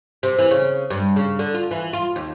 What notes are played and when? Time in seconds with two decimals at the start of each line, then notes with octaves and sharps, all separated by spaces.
0.23 C3
0.39 E3
0.51 C#3
0.90 G2
1.16 C#3
1.39 D3
1.54 F4
1.71 E3
1.93 F4
2.16 D#2